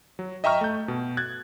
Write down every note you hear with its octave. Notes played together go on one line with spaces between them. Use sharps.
F#3
D#5 E5 G5 A#5 C#6 F6
A3 G6
B2
F#6 G#6 A6